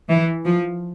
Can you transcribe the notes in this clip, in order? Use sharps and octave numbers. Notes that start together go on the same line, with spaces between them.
E3
F3